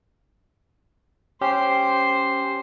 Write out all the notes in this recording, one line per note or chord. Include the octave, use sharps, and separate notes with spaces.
C#4 G4 C5 C6